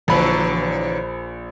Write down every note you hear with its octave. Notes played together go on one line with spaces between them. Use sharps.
A#1 D3 E3 F#3 B5